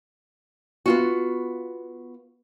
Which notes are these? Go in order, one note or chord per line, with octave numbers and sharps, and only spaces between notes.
B3 F4 F#4